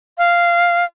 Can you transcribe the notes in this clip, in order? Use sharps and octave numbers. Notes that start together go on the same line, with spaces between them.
F5